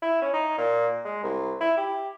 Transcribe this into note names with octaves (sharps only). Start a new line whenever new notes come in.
E4
C#4
D#4
A#2
G#3
C2
E4
G4